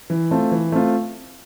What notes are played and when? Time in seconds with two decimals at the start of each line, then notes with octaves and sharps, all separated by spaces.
0.10 E3
0.31 A3 C4 F4
0.51 E3
0.72 A3 C4 F4